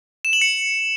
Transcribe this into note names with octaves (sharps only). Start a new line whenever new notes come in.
E7
F#7
C#7